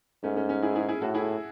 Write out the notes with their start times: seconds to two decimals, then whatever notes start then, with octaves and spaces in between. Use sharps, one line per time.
0.23 G#2 A3 C#4
0.37 A3 C#4
0.49 A3 C#4
0.62 E4 G#4
0.75 E4 G#4
0.89 E4 G#4
1.01 A2 F#4 A4
1.14 E4 G#4